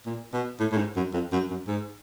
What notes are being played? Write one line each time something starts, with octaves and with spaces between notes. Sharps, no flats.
A#2
B2
A2
A2
G#2
F#2
F2
F#2
F#2
G#2